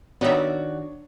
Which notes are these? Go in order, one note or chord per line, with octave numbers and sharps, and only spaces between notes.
D#3 B3 D4 D#4 F#4 C#5 D5 E5